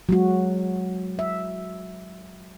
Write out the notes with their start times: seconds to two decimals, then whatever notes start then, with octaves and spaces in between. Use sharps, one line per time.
0.09 F#3 G#3 F#4
1.19 E5